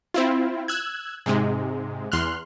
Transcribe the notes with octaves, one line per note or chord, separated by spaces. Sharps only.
C4 E4 F4
E6 F#6 G#6
G#2 C3 G#3
E2 C6 F6 F#6